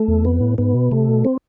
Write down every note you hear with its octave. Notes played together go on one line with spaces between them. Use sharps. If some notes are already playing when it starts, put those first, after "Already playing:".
Already playing: A3
E2
F2 B3
A2
G#2 B3
B2
C3 A3
B2
C4